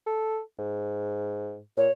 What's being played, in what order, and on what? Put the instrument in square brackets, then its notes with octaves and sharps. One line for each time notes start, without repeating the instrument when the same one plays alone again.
[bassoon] A4
G#2
[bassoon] A#2 [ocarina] C#5